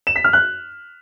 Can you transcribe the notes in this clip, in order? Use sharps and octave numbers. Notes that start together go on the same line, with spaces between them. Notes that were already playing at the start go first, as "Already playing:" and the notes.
E7
B6
F6
F#6